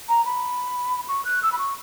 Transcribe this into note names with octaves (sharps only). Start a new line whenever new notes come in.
A#5
B5
C#6
F#6
E6
B5
C#6